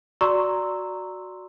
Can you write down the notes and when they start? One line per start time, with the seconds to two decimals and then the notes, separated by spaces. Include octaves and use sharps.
0.21 F#4 D5 A#5 C6 C#6 E6